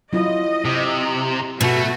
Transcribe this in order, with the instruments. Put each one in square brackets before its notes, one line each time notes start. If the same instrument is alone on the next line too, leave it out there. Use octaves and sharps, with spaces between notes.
[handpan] F#3 E4 F4 [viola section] D#5
[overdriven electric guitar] C3
[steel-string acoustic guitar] B2 [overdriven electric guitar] A3 [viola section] F#4